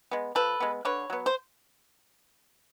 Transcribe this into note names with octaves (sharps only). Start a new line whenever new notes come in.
G#3 B3
F3 A4 B4
G#3 B3
D3 B4 C#5
F#3 B3
C5